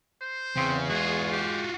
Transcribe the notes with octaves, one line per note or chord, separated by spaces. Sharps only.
C5
E2 C#3 C4
G#3 F4 F#4 G#4
G4